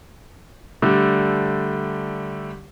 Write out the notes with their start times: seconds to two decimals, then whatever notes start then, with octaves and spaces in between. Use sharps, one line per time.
0.82 D3 G3 A3